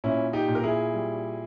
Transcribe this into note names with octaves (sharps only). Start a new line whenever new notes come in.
A#2 C#4 E4
D#4 G4
A#2
A#4
E4 G#4
G3